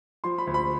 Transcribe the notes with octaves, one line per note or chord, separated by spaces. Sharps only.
F3 C6
B5
D2
B5